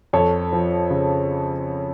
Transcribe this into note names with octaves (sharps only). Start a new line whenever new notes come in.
F2 A4 C#5
F3
C#3